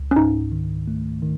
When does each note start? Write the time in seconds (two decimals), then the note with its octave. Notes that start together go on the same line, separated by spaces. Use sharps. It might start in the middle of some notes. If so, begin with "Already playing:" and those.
Already playing: C#2
0.11 C#4
0.16 G#2 D#4
0.52 D#3
0.88 A3
1.22 D#3